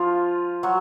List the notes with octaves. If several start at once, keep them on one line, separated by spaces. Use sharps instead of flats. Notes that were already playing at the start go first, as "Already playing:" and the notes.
Already playing: F3 F4
F#3 F#4